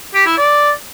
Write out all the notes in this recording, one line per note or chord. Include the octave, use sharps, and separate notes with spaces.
G4
E4
D5